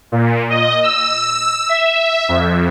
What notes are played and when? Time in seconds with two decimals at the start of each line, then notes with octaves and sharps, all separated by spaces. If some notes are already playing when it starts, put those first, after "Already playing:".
0.12 A#2
0.50 D#5
0.83 E6
1.69 E5
2.29 F2